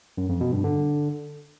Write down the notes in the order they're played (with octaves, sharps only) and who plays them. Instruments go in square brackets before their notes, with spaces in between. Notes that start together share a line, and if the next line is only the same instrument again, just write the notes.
[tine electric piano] F#2
F2
B2
G2
D3